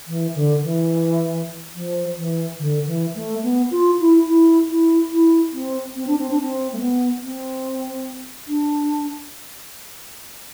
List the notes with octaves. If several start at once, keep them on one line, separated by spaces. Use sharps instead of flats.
E3
D3
E3
F3
E3
D3
E3
A3
B3
F4
E4
E4
E4
E4
C4
C4
D4
C4
D4
C4
A3
B3
C4
D4